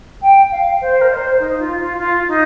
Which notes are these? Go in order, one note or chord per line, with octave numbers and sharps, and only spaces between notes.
G5
F5
C5
A#4
D#5
C5
D#4
F4
F4
F4
D#4